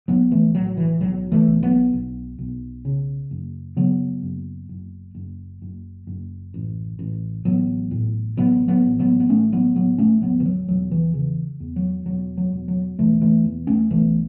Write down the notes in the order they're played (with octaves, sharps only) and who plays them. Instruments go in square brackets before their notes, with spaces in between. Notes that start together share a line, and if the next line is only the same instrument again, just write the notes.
[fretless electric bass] B1 F#3 B3
E3 A3
A2 F#3
E3
B1 F#3
E3 A3
B1
F#3 B3
B1
B1
C#3
F#1
C#3 F#3 B3
F#1
F#1
F#1
F#1
F#1
A1
A1
A1 F#3 B3
A2
A1 F#3 B3
F#3 B3
A1
F#3 B3
B3
A1 A3 C#4
F#3 B3
A1 F#3 B3
A3 C#4
E1 F#3 B3
E3
F#3
E1 F#3
E3
C#3 E3
E2
F#3
E1 F#3
F#3
E1
F#3
E1 E3 A3
E3 A3
E2
A3 C#4
B1 E3 A3